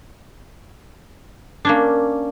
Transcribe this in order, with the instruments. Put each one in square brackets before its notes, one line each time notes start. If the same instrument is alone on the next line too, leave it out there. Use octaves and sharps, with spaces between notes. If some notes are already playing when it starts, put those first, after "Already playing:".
[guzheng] A#3 C#4 D4